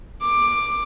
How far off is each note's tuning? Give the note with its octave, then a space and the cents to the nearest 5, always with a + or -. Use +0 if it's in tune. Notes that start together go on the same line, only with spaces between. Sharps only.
D6 +10